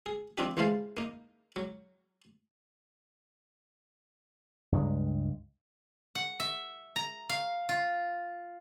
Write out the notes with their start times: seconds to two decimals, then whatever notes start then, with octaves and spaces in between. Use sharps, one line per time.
0.06 G#4
0.38 F3 C4 D4 D#4 G4
0.57 A1 E3 G#3 C5 F5 A5
0.97 A#3 D#4
1.56 F#3
4.72 C#2 G2 G#3
6.15 F#5
6.40 E5
6.96 A#5
7.29 F5
7.69 F4